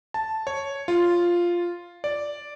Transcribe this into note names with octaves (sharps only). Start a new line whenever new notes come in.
A5
C#5
F4
D5